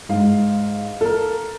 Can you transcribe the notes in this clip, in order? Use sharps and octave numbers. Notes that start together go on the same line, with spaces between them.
G#2 F5
A4 A#4